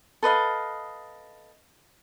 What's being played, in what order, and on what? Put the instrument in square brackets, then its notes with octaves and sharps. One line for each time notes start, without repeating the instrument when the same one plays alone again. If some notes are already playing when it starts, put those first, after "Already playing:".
[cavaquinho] A4 B4 D#5 F5